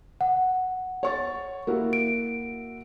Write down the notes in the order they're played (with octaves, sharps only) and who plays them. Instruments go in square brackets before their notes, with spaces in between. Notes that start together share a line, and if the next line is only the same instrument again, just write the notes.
[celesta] F#5
[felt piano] C#5 C#6 A6
A#3 E4 F#4
[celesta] D7